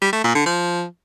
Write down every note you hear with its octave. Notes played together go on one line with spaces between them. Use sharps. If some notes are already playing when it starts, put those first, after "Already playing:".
G3
A3
A#2
D3
F3